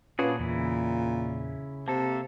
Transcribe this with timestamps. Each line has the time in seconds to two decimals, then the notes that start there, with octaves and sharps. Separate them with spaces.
0.19 A#2 C#4 D4 F4 F#4 G#4 B4
0.39 E2 C#3 E4
1.88 C3 A#3 A4 A5